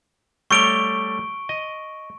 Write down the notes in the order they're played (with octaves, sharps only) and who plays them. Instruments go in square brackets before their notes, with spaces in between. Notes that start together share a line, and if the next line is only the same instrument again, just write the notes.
[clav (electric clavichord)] G3 A3 C#5 [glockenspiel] C#6 D7 G7
[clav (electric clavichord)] D#5